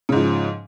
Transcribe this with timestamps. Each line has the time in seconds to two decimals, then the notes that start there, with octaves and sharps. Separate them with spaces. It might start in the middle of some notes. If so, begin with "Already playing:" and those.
0.09 C#3
0.12 G#2
0.15 F3